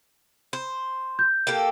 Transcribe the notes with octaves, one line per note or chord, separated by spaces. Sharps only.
C5
G6
A#3 G4 A4